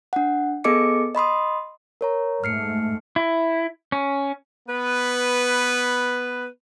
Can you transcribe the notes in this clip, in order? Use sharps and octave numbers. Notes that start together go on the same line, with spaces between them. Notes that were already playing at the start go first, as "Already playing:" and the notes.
D4 F#5
B3 G#4 A4 D#5 D6 C#7
D#5 B5 C6 D#6
A#4 C#5 A#5
G#2 A3 F6 C7 C#7
E4
C#4
B3 B4